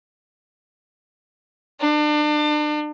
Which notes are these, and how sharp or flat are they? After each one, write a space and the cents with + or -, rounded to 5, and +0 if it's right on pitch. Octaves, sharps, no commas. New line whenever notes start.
D4 +35